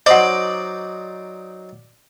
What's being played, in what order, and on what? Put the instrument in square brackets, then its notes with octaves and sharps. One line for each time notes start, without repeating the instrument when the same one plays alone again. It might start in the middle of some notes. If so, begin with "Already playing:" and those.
[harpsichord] F#3 D#4 C5 [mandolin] D5 [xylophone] D#5 F#5